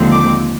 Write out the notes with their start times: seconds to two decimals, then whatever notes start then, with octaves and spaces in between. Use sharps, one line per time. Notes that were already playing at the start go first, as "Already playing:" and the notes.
Already playing: D#2 D3 F3 G#3 C4
0.12 D6